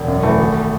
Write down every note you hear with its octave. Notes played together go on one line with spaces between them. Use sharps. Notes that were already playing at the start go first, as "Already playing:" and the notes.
Already playing: E1
F#2
E3 A3
G#1